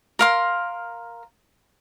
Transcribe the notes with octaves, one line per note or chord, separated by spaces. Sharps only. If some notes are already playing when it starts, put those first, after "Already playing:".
A#4 F5 C6